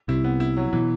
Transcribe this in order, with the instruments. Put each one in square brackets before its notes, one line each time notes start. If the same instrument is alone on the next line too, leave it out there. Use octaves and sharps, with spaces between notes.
[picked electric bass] C2 C3 [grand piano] E4
[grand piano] B3
E4
F#3
[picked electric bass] B2 [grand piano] E3